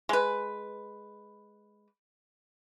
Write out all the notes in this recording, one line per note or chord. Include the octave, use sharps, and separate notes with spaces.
G#3 B4